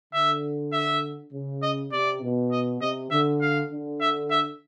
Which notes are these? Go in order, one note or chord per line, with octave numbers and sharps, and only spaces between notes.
D3 E5
E5
C#3
D#5
C3 D5
B2
D#5
C3 D#5
D3 E5
F5
D3
E5
E5